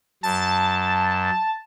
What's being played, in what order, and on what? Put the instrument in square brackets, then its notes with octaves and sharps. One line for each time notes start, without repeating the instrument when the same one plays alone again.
[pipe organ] F#2 [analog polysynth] A5